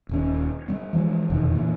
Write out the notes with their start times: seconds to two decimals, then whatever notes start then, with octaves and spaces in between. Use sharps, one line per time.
0.09 D#1 D#2 C#4
0.68 G3 B3
0.93 E3 F3 G3 G#3
1.30 F1 E2 B2 D#3
1.55 A#2 E3